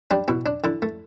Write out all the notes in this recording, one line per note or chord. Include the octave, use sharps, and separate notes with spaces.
G3 D4
B2 E4
D4
D3 E4
A3